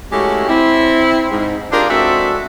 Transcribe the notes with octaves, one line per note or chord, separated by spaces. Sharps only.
G#3 A3 C#4 E4 F#4 G4
C4 E4
G#2
D4 F4 G4 G#4 A#4 D5
G#3 C4 D4 F#4 A4 E5